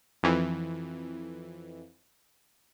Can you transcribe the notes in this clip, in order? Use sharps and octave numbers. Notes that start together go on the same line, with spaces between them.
F2 E3